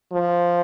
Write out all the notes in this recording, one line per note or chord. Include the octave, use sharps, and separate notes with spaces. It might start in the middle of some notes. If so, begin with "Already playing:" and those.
F3